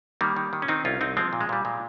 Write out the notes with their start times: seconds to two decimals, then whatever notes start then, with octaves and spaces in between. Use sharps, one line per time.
0.21 D#3 G3 A#3
0.36 D#3
0.53 D#3
0.62 C#4
0.68 D#3 C4 D#4
0.85 C2 C#4 F4
1.01 C2 C4 D#4
1.17 F3 G#3 C4
1.33 A#2
1.41 G#3
1.49 A#2 G3
1.65 A#2 G#3